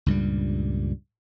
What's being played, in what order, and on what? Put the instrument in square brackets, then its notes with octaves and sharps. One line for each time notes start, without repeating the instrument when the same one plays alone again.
[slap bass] C#2 G2 A#2 G3